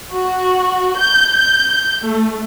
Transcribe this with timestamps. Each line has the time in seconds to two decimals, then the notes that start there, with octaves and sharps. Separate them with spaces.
0.11 F#4
0.99 G6
1.30 G6
2.02 A3